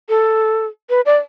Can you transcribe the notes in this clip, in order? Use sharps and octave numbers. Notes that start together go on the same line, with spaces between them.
A4
B4
D5